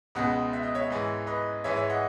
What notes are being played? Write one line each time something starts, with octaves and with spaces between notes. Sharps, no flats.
C#2 B2 G#3 D#5 F#5
E5
D#5
C#5 E5
G#2 E3 G#3
B4 D#5
G#2 E3 G#3 C#5 E5
C#5 E5
D#5 F#5